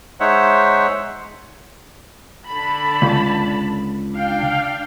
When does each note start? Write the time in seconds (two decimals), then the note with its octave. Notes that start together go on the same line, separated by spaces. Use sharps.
0.20 G#3 D#4 C5 C#5 E5 F#5
2.48 D3 A5 B5
3.02 C#2
4.12 D4 F5 G5